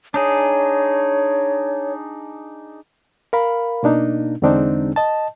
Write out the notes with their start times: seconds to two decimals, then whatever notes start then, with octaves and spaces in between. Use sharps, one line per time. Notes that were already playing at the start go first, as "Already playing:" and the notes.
0.14 D4 D#4 G#4 C#5
3.33 A#4 F5 B5
3.83 B2 A#3 D4 D#4
4.42 E2 D3 G#3 C4 D4 D#4
4.96 D#5 A5